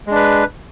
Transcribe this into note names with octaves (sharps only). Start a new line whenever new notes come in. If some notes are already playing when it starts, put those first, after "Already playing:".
G#3 D4 B4